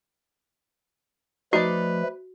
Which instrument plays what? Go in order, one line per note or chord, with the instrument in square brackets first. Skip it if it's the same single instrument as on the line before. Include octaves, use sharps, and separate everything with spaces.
[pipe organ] F3 A3 [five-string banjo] D#4 D5 [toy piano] F#4 [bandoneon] B4